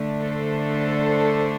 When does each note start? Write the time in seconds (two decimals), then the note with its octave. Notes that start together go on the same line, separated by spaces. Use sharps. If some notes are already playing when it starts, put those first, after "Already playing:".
Already playing: D3 A3 D4
0.19 A4 C5